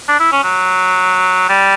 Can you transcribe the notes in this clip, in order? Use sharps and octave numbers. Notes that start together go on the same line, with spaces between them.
D4
E4
C#4
F#3
G3